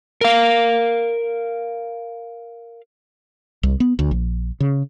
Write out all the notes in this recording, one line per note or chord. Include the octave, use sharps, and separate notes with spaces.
A#4 F5
C2
B3
D2
A#1
C#3